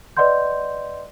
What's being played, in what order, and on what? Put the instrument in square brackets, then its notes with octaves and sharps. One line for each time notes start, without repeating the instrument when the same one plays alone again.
[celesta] B4 D5 D#5 F#5 C6 G6